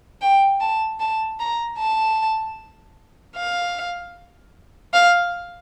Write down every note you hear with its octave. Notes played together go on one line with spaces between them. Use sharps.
G5
A5
A5
A#5
A5
F5
F5